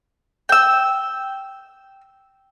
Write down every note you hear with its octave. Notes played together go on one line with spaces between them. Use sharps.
G5 E6